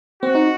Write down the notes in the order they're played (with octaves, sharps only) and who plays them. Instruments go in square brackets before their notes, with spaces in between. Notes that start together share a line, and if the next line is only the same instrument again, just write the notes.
[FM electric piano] C4 [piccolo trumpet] F#4
[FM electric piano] D#4